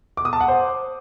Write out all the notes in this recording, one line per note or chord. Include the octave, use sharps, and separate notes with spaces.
D6
D#6
A5
F#5
C5